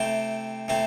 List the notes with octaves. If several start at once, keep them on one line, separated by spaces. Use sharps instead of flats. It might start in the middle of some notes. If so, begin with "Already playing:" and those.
Already playing: C3 A3 C4 E4 G5
C3 A3 C4 E4